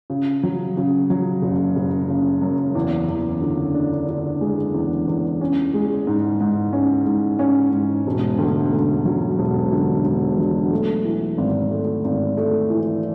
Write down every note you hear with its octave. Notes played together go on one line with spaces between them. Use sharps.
C#3
F#3
C#3
F#3
F#1
F#1
C#3
F#2
E2
E2
D3
D4
D3
G#3
E2
E2
C#4
G#3
G#2
G#2
C#4
G#2
C#4
G#2
E1
D2
D2
F#3
E1
D3
E1
F#3
A3
E3
G#1
A3
G#1
A3
E3